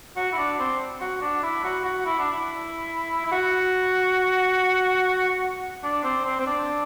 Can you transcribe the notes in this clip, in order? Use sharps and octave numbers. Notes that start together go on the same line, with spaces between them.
F#4
E4
D4
C4
F#4
D4
E4
F#4
F#4
E4
D4
E4
E4
F#4
D4
C4
C4
C4
D4